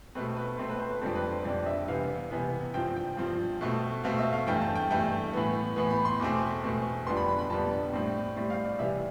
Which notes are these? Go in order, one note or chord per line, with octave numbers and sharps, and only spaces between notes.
B2 A3 C4 B4
B4
B2 A3 C4 C5
B4
C5
B4
F2 D3 G3 C4 A4
B4
C5
F2 D3 G3 C4 D5
E5
C3 E3 B3 F5
C3 E3 B3
G2 F3 C4 G5
G5
G2 F3 C4
B2 A3 C4
B2 A3 C4 F5
E5
F5
G2 E3 A3 G5
A5
G5
G2 E3 A3 G5
A2 E3 B3
A2 E3 B3
B5
C6
E2 B2 A3 C4 D6
E2 B2 A3 C4
F2 D3 G3 B3 C6
B5
B5
B5
F2 D3 G3 B3 A5
A2 G3 C4
A2 G3 C4
F5
D5
C3 E3 G3 E5